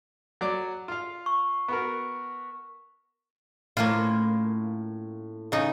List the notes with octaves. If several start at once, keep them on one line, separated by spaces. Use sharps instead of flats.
F#3 D5 D6
F4 F5
C#6
B3 F#4 A#4
A2 A#3 C#4 F4
C#3 D#4